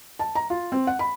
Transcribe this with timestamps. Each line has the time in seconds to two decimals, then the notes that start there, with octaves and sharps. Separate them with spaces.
0.19 A5
0.35 A#5
0.50 F4
0.72 C4
0.87 F#5
0.99 B5